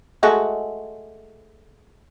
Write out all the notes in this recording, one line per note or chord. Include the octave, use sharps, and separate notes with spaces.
G#3 A3 F#4